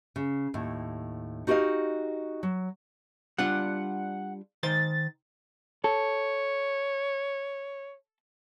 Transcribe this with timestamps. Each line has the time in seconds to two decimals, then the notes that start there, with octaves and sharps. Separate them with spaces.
0.16 C#3
0.54 D#2 A2
1.47 D#4 F#4 G4 C5 D#5 F5
2.43 F#3
3.38 G3 D4 F4 F#5
4.63 D#3 C5 C6 A6
5.84 A4 C#5